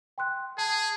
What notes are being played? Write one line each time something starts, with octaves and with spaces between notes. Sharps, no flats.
G5 C6 F#6
G#4 A5